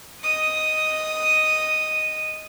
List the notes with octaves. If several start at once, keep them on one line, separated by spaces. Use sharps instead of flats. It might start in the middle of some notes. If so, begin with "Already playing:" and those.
D#5 D#6